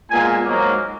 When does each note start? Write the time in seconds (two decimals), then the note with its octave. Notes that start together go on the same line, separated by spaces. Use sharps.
0.10 A#2 G#3 B3 G#5
0.44 G#2 F#3 A#3